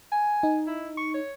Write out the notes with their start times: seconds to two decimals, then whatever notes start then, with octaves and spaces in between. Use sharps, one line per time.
0.12 G#5
0.43 D#4
0.67 E4
0.98 C#6
1.14 C#5